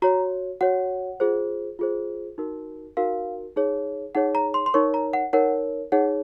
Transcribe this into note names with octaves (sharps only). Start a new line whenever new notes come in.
F#4 C#5 A#5
F#4 C#5 F#5
F4 G#4 C5
F4 G#4 C5
D#4 F#4 A#4
D#4 F#4 A#4 F5
D#4 G#4 C#5
D#4 G#4 C#5 F#5
A#5
C6
C6
D#4 A#4 C#5 C#6
A#5
F#5
D#4 A#4 C#5 F#5
D#4 G#4 C#5 F#5